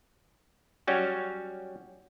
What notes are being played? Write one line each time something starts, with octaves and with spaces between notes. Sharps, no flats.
F#3 G3 C#4 F#4